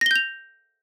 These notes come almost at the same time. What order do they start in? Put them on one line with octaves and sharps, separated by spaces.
A#6 G7 G6 F7